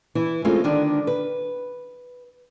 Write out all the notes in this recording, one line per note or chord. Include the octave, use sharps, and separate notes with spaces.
E3 E4
G#3 A3 C4 C#4 F4
D3 D#3 D4
B4